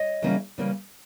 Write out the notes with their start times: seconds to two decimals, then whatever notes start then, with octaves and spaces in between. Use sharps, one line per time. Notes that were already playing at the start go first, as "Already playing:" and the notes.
Already playing: C#5 D#5
0.22 C#3 E3 G3 A#3 C#4
0.58 C#3 E3 G3 A#3 C#4